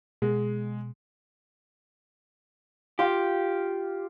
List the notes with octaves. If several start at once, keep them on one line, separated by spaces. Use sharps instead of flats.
B2 G#3
F4 G4